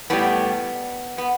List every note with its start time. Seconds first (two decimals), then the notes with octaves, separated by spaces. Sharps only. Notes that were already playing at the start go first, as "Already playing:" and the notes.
0.10 A2 G3 B3
1.18 B3